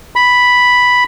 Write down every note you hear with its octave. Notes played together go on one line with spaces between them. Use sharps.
B5